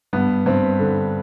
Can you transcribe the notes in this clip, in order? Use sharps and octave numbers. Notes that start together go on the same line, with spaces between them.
G2 B3
G2 C4
D3